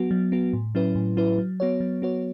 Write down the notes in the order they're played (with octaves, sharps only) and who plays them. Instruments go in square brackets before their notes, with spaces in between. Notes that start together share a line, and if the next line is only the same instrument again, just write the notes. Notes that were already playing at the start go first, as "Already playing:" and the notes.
Already playing: [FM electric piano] F#3 B3 F#4
F#3
B3 F#4
A2
F#3 C#4 E4 B4
A2
F#3 C#4 E4 B4
F#3
B3 F#4 C#5
F#3
B3 F#4 C#5